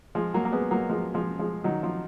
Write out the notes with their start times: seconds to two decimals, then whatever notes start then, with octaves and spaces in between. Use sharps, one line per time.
0.15 F3 G#3
0.34 F#3 A#3
0.45 A#3
0.52 G#3 B3
0.71 F#3 A#3
0.89 F3 G#3
1.14 F3 G#3
1.39 F3 G#3
1.64 D#3 F#3
1.83 F3